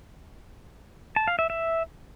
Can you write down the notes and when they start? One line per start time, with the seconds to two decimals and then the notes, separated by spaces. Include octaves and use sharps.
1.16 A5
1.28 F5
1.39 E5
1.50 E5